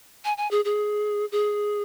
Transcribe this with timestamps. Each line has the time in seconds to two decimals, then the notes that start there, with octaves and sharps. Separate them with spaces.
0.25 G#5
0.37 G#5
0.51 G#4
0.65 G#4
1.32 G#4